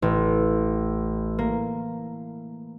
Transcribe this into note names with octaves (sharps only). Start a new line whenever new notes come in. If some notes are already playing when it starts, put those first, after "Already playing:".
A1
A#3